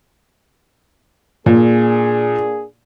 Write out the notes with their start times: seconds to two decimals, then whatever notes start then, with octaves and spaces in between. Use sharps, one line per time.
1.46 A#2 A#3 D4 G#4